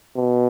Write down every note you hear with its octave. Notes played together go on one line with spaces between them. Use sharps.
B2